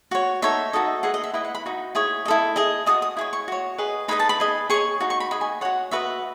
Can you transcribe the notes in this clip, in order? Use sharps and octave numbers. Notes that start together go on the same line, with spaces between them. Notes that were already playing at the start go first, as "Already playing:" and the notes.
F#4 C#5
D#4 A4 C#5 E5
D#4 F#4 A4 D#5
G#4 B4 D#5 F#5
D#5
E5
E4 B4 D#5 E5
F#5
B5
D#4 F#4
E4 G#4 C#5
E4 A4 D#5
G#4 D#5
F#4 A4 D#5 D#6
D#6
E4 G#4 C#5
C#6
F#4 C#5
G#4 B4 D#5
D#4 G#4 B4 D#5 B5
A5
B5
G#4 D#5
G#4 C#5 C#6
D#4 F#4
C#6
B5
G#4 D#5 B5
G#5
F#4 C#5 F#5
F#4 B4 D#5 E5